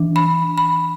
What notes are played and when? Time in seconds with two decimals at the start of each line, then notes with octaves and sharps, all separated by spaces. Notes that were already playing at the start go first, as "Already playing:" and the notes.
Already playing: E3 D4
0.16 B5
0.58 B5